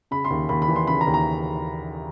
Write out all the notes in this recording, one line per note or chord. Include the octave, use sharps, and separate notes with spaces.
C#3 B5
C6
D#2
D#2 B5
B5
E3
C6
C#3 B5
A#5
D#2
A#5